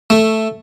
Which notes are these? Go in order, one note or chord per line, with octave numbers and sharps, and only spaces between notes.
A3